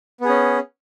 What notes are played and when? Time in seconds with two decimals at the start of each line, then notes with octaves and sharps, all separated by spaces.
0.21 B3
0.25 G#4
0.29 C#4